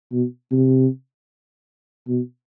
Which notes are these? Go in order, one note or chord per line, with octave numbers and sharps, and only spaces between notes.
B2
C3
B2